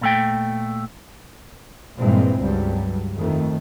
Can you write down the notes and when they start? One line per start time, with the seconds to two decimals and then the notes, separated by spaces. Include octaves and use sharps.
0.01 A#2 A3 G5
1.98 G2 A#2 E3 G#3 C4
2.40 C#2 G2 F#3 G3
3.17 F2 D#3 A3